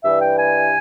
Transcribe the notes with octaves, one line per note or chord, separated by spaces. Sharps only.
G2 E3 G3 E5
G5
G#5